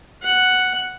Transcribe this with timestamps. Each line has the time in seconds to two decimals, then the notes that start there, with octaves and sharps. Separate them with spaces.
0.22 F#5